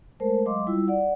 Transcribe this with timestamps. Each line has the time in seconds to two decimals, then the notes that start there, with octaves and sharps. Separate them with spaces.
0.20 G#3 A3 A4 A#4 C5 A5
0.45 F#3 G#3 D#5 F5 C6 D6
0.67 G3 E4 F4 E6
0.88 D5 F#5